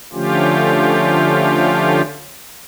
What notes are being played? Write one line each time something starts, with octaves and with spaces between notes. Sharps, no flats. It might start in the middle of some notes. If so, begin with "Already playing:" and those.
D3 F3 A3 C#4 F4 G4